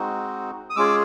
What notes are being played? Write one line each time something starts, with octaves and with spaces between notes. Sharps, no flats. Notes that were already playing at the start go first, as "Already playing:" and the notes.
Already playing: G#3 C4 D#4 F#4
D#6
G#3 C#4 F4 G#4 D6 E6